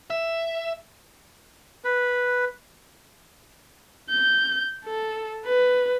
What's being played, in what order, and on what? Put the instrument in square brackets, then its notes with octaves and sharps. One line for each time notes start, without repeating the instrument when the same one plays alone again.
[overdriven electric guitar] E5
[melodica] B4
[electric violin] G6
A4
B4